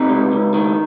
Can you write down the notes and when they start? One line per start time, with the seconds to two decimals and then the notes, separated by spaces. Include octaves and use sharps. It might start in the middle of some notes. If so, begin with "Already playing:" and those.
Already playing: C3 D#4
0.09 C#2
0.32 C#2
0.54 D#3